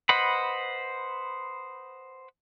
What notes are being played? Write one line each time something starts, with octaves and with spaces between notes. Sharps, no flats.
B4 C5 D#5 F#5 B5